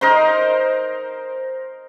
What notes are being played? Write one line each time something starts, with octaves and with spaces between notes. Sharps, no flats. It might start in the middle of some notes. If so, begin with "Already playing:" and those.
D#4 A#4 C5 C6